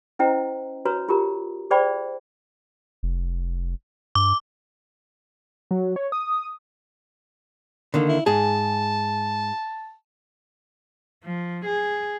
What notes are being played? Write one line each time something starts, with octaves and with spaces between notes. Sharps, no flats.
C#4 E4 C5 D#5 G5 A#5
F#4 B4 C#5 A#5
F4 G4 A#4 A#5
G#4 C5 D5 G5 B5
F1
G2 D6
F#3
C#5
D#6
D3 D#3 A#3
E4
G#2 G#4 A5
F3
G#4